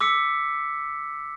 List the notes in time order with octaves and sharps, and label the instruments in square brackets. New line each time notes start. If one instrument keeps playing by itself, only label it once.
[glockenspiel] D6 E6 B6 C#7